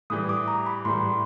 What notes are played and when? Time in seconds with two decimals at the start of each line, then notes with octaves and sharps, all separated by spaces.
0.10 A2 E3 G3 D#6
0.29 D6
0.48 A#5
0.66 B5
0.85 A2 E3 G3 C6